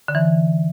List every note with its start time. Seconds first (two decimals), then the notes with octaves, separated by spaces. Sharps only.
0.08 D3
0.15 E3